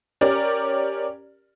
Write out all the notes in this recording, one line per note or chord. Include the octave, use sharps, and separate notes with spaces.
C#4 G4 A#4 D5